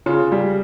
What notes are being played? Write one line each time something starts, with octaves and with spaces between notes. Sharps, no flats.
C#3 F4
G3